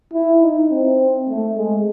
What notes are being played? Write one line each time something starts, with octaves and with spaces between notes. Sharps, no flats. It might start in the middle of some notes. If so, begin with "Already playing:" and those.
E4
D#4
C4
A3
G#3